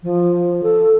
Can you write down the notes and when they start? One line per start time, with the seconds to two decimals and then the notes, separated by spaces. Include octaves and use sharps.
0.03 F3
0.62 A4